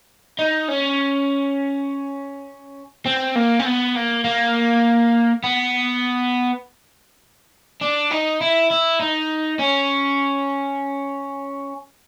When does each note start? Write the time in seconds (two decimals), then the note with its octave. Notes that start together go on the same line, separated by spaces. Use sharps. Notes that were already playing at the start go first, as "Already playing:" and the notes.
0.39 D#4
0.69 C#4
3.06 C4
3.36 A#3
3.59 C4
3.65 B3
3.95 A#3
4.25 A#3
5.44 B3
7.81 D4
8.11 D#4
8.41 E4
8.70 E4
9.00 D#4
9.59 C#4